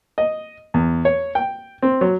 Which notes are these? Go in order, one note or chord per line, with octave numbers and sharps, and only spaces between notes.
D#5
E2
C#5
G5
C4
F#3